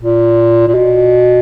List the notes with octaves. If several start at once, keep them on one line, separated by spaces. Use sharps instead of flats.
A#2
A#2
B2